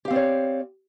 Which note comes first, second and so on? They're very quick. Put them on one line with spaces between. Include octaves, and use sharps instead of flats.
G4 F5 C4 D5 C#5